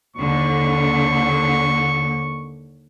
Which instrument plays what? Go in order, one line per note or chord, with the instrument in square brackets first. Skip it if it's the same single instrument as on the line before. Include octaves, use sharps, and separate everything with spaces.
[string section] D#2 D3 [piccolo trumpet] C#6